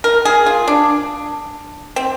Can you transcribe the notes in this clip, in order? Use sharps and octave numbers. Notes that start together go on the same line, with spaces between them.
A#4
G#4
F4
D4
C4